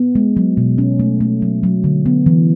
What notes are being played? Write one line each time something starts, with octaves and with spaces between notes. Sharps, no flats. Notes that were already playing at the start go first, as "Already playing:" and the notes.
Already playing: B3
G#3
F#3
B2
C#4
A3
A3
F#3
F#3
D3
B3
E3